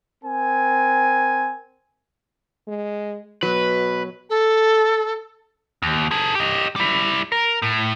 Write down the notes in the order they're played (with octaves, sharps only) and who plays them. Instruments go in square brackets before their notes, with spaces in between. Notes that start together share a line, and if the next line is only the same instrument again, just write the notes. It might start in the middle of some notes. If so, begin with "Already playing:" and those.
[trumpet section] C4 A#4 G#5
[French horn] G#3
[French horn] B2 [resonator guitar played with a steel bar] F#3 [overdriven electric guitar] B4
[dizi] A4
[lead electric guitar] D#2
G#4 A4
G4 D#5
G3 E4
A#4
A2